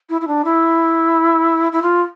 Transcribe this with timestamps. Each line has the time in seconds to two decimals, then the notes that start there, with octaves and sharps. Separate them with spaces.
0.09 E4
0.21 E4
0.27 D4
0.44 E4
1.72 E4
1.82 F4